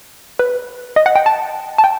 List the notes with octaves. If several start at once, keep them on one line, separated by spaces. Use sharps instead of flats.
B4
D#5
F#5
G5
A5
A5
G5